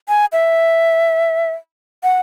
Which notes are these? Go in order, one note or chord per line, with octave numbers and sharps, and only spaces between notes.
G#5
E5
F#5